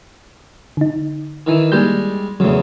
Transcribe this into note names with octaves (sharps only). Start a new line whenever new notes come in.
D3 D#4
D#3 E3
G3 G#3 A#3 G6
E2 C#3 F#3 A3